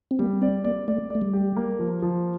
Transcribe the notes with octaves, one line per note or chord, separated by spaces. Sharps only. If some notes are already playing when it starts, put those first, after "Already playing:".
C4
G3 A#3
C4 D5
A#3 D5
A3 D5
A3 D5
G3
G4
A#3
F3
F3